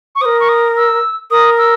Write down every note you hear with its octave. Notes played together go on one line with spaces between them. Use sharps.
C#6
A#4 C5 D#6
C#6
D#6
E6
A#4 D#6
E6